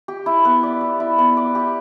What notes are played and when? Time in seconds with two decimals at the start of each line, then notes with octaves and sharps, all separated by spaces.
0.08 G4
0.26 E4
0.45 B3
0.63 D5
0.81 G4
1.00 E4
1.18 B3
1.37 D5
1.55 G4